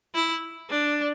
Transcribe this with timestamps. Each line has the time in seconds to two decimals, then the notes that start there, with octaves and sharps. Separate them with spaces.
0.15 E4
0.69 D4